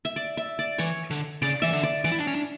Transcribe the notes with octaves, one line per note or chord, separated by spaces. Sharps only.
E5
D5
E5
D5
E3 C#5
D3
C#3 D5
E3 E5
D3
D5
E3 D5
E4
D4
C#4
D4